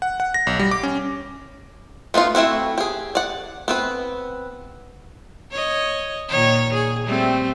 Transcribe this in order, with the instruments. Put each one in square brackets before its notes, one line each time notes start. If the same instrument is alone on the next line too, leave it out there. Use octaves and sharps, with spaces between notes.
[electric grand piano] F#5
F#5
A#6
B1
G3
D6
C#4
[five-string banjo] A3 B3 D#4 F4
A3 C4 E4 F#4
G4 G#4
D5 F#5
B3 C4 B4
[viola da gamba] C#5 D#5
A#2 D#3 C#5
G#4
G3 A3 C4